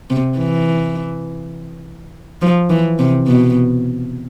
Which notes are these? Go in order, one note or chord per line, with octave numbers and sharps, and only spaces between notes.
C3
E3
F3
E3
C3
B2